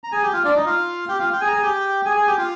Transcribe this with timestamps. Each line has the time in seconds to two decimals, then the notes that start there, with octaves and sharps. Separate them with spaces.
0.04 A#5
0.12 G#4 G#5
0.23 G4 G5
0.33 F4 F5
0.45 D4 D5
0.56 D#4 D#5
0.66 F4 F5
1.09 G4 G5
1.20 F4 F5
1.33 G5
1.41 G#4 G#5
1.48 A#5
1.53 G#4 G#5
1.63 G4 G5
2.06 G#4 G#5
2.17 G#4 G#5
2.27 G4 G5
2.38 F4 F5